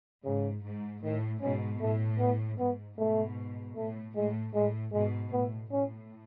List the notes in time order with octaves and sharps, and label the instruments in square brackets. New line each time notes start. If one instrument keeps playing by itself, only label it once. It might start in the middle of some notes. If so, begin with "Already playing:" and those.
[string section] G#2 [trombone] C#3
[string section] G#2
[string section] A2 [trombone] D#3
[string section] G#2 B2 [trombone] C#4
[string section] A2 [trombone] A3
[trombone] B3
[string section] G#2 [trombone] B3
[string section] G#2 B2 [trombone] A3
[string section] A2 [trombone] A3
[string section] A2 [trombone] G#3
[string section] A2 [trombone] G#3
[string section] G#2 B2 [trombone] G#3
[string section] A2 [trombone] B3
[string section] A2 [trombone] C#4